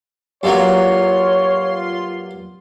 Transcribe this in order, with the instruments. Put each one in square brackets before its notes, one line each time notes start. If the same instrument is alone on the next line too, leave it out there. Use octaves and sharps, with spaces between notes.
[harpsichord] G2 F#3 A#3 [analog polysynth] F4 C6 [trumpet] C#5